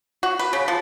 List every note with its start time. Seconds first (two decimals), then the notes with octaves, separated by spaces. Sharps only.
0.23 F#4
0.39 B4
0.53 C#3
0.68 F3